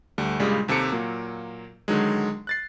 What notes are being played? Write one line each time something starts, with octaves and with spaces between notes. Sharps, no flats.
D2 G3 A3
G2 A#2 C#3 G3 G#3
D#2 C3 G4 A4 C#7 D7
A#2 F#3 A#3
D3 D#3 F#3 G#3
F#6 A6 C7